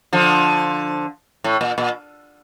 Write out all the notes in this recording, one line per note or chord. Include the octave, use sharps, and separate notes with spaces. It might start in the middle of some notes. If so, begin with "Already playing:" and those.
D3 F3
A2
A#2
A#2